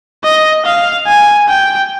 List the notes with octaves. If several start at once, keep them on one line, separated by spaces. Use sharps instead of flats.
D#5
F5
G#5
G5